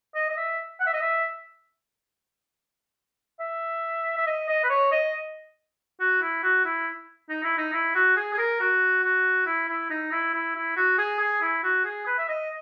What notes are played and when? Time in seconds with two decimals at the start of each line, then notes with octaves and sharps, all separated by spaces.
0.15 D#5
0.30 D#5
0.36 E5
0.80 F#5
0.86 E5
0.93 D#5
1.01 E5
3.40 E5
4.17 E5
4.26 D#5
4.48 D#5
4.63 B4
4.69 C#5
4.91 D#5
6.00 F#4
6.22 E4
6.43 F#4
6.65 E4
7.29 D#4
7.43 E4
7.57 D#4
7.73 E4
7.95 F#4
8.16 G#4
8.34 G#4
8.38 A#4
8.60 F#4
9.03 F#4
9.46 E4
9.68 E4
9.90 D#4
10.12 E4
10.34 E4
10.55 E4
10.76 F#4
10.98 G#4
11.20 G#4
11.41 E4
11.63 F#4
11.85 G#4
12.07 B4
12.18 E5
12.28 D#5